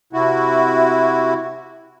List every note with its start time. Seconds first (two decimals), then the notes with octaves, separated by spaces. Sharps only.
0.13 C3 E4 F#4